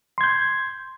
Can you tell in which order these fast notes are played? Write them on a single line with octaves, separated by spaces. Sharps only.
C6 G#6 G6